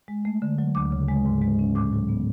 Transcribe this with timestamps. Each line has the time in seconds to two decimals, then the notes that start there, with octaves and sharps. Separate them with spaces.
0.08 G#3
0.25 A3
0.42 D3
0.58 F#3
0.75 D2 D6
0.92 C#3
1.08 G#3
1.26 G#2
1.42 G#3
1.59 C#4
1.75 A2 D6
1.93 F#3
2.09 B3